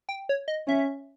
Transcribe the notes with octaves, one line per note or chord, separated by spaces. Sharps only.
G5
C#5
D#5
C#4 E5